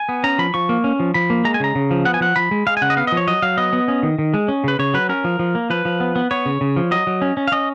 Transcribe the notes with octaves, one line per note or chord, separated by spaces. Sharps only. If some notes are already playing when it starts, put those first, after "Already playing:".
Already playing: G#5
B3
C#4 A#5
F3 B5
F3 C#6
A#3
C#4
F3
F3 B5
A#3
G#3 A#5
G#5
C#3 A#5
C#3
F3
B3 F#5
G#5
F3 F#5
F3 B5
G#3
G#3 F5
G#5
C#3 F#5
D#5
B3 F5
F3 D#5
C#5
F#3 D#5
F#3 F5
B3 D#5
B3
C#4
D#3
D#3
G#3
C#4
C#3 B4
C#3 C#5
F#3 B4
C#4 A#4
F3
F3
A#3
F3 B4
F3
B3
B3
B3 C#5
C#3
C#3
F3
F#3 D#5
F#3
C#4
C#4
F5
C#4 D#5